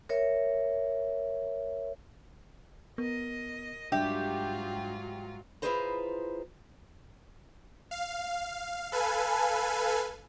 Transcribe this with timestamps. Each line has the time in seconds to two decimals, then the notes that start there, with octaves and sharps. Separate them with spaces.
0.09 A#4 C#5 E5
2.98 B3 A#4 D#5
3.92 G#2 F#3 G3 D4 F4 G4 E5
5.62 E4 F4 G#4 B4 C5 A#5
7.91 F5
8.92 A4 B4 F5 G#5